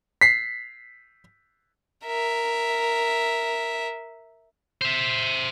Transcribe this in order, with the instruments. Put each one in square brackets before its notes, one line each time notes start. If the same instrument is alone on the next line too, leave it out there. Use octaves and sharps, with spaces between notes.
[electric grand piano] B6 C7
[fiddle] A#4 E5
[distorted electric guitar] C5 E5